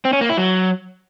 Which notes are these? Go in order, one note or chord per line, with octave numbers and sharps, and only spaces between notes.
C4
C#4
A#3
E4
F#3